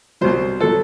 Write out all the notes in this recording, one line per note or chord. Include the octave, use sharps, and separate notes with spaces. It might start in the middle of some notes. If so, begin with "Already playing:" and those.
C2 B2 F#3 C5
B2 F#3 A4